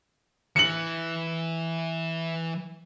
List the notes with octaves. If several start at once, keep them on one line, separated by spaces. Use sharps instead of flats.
E3 C#7 F#7